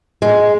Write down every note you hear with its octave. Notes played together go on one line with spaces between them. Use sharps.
G#3